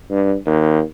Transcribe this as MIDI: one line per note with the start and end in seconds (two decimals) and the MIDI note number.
0.10 0.35 43
0.46 0.81 39